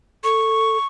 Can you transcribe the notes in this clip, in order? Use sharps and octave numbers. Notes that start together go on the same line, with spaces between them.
A4 C#6